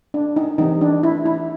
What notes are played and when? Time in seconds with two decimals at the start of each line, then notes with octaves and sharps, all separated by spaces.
0.14 D4
0.36 D#4
0.58 E3 G3 C4 D#4
0.81 D4
1.03 E4
1.26 E4